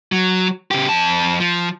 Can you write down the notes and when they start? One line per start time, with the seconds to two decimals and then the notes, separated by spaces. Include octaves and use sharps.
0.12 F#3
0.71 C#3 G4
0.89 F2 A5
1.40 F3